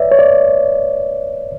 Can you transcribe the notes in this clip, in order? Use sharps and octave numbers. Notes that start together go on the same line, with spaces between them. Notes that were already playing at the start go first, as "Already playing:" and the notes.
Already playing: B4 C#5 D5 E5
C#5
D5